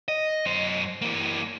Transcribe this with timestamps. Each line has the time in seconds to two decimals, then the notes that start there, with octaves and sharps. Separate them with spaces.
0.08 D#5
0.46 F#2 C5
1.02 E3 A#3